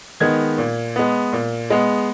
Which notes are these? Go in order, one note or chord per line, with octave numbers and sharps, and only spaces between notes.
D#3 G#3 B3 G#6
A#2
G#3 B3
A#2
G#3 B3